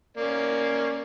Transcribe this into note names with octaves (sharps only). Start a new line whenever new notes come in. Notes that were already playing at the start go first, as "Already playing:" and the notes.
A#3 C#4 D5